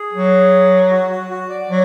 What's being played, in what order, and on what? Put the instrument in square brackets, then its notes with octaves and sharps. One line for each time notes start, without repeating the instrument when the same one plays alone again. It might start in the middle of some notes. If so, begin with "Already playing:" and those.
Already playing: [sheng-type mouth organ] G#4
[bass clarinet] F#3
[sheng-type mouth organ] F#4
F#4
F#4
D5
[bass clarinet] F#3